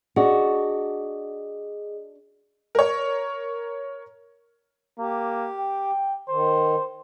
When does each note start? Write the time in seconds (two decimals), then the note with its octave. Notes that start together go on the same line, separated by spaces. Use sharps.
0.16 D4 F#4 G#4 D#5
2.75 A#4 C#5
4.99 A#3 G4
5.59 G5
6.29 D#3 C5